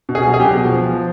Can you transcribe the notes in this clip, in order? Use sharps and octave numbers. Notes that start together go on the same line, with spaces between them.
B2
G#4
F#3
G#4
G4
B2
F3
F3